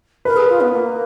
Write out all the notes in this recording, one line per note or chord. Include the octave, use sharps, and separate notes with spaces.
A#4 B4
G#4
F4
B3
A#3